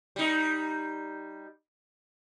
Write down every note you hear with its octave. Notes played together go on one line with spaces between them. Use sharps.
G3 D#4